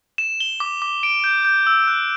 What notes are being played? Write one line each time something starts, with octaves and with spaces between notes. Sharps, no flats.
E7
G7
D6
D6
D7
G6
G6
E6
F#6